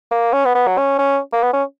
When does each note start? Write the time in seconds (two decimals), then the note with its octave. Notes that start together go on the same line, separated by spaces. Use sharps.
0.11 A#3
0.33 C#4
0.45 B3
0.55 B3
0.67 F#3
0.78 C#4
0.99 C#4
1.33 A#3
1.43 B3
1.53 C#4